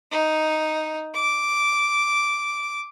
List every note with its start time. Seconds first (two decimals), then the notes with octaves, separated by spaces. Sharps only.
0.11 D#4
1.14 D6